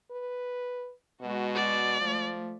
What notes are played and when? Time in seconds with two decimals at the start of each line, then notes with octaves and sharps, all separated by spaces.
0.11 B4
1.22 B2 G#3 F#4
1.55 D5
2.01 F3 A3